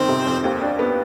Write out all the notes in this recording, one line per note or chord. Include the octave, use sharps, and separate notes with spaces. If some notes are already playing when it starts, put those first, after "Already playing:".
Already playing: G1 F2 D#3 C4 C5
C3
F2
D#2
D4
B3